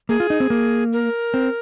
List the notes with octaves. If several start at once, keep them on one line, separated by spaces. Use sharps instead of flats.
A#3 G#4
F4
D#4
C4
A#3
A#4
C4